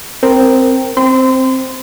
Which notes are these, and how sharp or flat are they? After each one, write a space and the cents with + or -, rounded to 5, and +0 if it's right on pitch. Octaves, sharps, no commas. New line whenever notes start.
C4 +0 A#4 +0 G5 +0
C4 +0 C6 -30